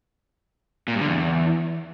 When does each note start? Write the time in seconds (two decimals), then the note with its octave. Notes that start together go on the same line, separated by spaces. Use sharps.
0.88 A#2
0.94 G2
1.01 D3
1.08 E2